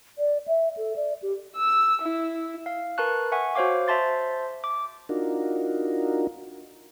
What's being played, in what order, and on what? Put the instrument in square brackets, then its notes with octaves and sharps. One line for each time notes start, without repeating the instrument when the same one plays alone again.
[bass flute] D5
E5
A4
D5
G4
[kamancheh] E6
E4
[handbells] F5
A#4 B4 A5 C#6 F#6
E5 F#5 G#5 C#6
F#4 C5 C#5 F5 D6
C5 E5 A5 C6 A6
D6
[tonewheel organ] D4 D#4 F4 F#4 A#4